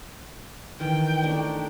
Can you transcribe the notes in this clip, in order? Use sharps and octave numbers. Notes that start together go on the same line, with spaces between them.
D#3 E3 G5
A3 D4 D#4